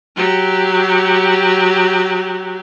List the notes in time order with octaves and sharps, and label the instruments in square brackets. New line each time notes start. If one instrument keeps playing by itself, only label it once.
[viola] F#3 G4